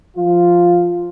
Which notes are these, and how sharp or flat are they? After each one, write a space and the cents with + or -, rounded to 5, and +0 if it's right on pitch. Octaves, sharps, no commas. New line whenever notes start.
F3 +0 F4 +0